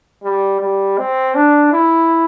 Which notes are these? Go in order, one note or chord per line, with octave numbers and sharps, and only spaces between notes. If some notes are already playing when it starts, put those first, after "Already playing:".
G3
G3
C4
D4
E4